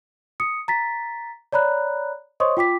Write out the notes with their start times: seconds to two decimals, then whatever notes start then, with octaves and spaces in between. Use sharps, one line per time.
0.40 D#6 C#7
0.68 A#5 A6 B6
1.52 C#5 D5 A#5 B5 F#6
2.40 C5 C#5 D#5 C6 C#6 D#6
2.57 F4 G5 D6 B6